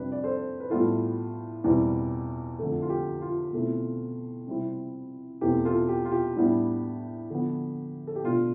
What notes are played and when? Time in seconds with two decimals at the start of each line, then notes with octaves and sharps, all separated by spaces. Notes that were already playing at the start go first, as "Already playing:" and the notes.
Already playing: F2 C3 G3 D4 B4
0.12 D5
0.24 A4 C5
0.60 B4
0.70 A2 G3 B3 E4 F4 A4
1.64 E2 B2 G3 C4
2.59 F2 D3 A3
2.82 F4
2.90 G4
3.21 F4
3.53 B2 A3 C4 E4
4.48 C3 G3 C4 E4
5.41 E2 B2 A3 C4 G4
5.65 F4 A4
5.89 G4
6.05 F4
6.12 G4
6.36 A2 G3 B3 D4
7.30 D3 F3 B3
8.07 A4
8.16 G4
8.24 B2 A3 D4 F4